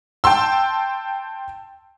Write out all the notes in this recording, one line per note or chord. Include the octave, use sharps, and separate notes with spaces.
G5 A5 C6 E6